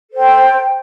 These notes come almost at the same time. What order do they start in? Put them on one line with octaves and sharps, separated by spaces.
A4 C5 G5